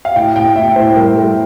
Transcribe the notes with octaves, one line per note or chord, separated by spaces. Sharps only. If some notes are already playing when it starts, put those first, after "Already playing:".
F5
A2 G5
A2 G5
A2 E5
A2 C5
G3 A#4
G3 A4